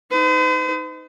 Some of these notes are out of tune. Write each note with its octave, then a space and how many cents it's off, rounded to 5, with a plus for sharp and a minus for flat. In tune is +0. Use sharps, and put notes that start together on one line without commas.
D#4 +15 C5 -45